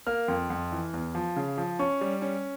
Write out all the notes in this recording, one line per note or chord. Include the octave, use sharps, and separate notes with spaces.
A#3 F6
F2
F2
E3
E2
F3
C#3
F3
C#4 C#6
G3
C#4